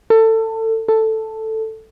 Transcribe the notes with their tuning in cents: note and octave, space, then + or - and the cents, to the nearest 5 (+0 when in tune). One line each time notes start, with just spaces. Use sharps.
A4 +25
A4 +5